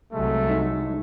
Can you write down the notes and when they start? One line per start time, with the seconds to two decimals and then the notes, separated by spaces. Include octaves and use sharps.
0.13 C2 F#3 G#3 A3
0.50 D#4